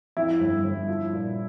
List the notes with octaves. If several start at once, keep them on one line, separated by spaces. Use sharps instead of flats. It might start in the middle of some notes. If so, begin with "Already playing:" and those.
F2 E4
G1
G1
F3
A#2